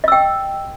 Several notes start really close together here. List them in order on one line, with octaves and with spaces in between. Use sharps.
D#5 E6 G5